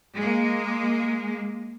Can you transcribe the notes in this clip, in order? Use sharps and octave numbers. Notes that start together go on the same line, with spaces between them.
G#3 A#3